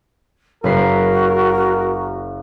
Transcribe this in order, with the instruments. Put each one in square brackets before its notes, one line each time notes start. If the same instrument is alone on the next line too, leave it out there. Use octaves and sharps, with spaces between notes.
[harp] F#1 B4 C7 [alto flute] F#4 [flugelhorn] A#4